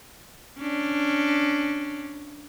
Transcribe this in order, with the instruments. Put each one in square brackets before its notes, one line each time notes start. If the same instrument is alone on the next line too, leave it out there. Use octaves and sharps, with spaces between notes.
[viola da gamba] C#4 D4